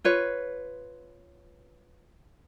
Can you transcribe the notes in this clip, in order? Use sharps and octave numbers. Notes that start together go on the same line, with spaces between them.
F4 B4 C#5